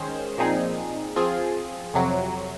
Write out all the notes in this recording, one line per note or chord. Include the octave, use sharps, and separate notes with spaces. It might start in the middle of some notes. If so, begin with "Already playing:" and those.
Already playing: D#3 G#3 C#4 G#4 C5
A#2 F3 C4 D#4 G#4
F3 C4 F4 G#4
F2 C3 F#3